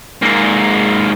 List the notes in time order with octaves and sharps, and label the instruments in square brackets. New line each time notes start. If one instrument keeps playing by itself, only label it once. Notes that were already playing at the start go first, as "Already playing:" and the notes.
[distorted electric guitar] G#2 A#3